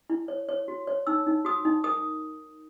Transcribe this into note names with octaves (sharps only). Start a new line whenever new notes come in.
E4
C#5
C#5
F#4
C#5
D#4 E6
D#4
F#4 D#6
D#4
A#4 D#6